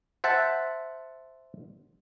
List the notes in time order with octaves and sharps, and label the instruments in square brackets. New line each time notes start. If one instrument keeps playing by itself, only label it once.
[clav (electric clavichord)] C5 E5 F#5 A5